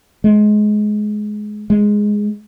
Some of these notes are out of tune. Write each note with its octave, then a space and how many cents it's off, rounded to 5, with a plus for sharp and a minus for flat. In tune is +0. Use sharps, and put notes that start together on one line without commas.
G#3 +20
G#3 +0